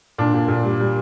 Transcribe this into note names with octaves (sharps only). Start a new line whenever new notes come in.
A#2 D4
A#2
A#2
G3
G3